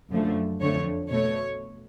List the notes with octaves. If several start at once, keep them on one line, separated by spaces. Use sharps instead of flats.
F#2 D3 F3 A3
F2 D3 F3 A3 C#5
B2 A3 C#5